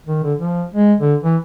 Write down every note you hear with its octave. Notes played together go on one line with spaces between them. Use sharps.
D#3
D3
F3
G#3
D3
E3